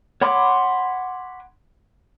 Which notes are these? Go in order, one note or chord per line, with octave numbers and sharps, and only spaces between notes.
C#5 F#5 B5 C6 D6